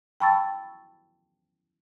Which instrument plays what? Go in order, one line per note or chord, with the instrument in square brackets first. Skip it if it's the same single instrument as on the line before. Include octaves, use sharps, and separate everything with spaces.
[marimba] G5 A5 B5 C#6 E6 A6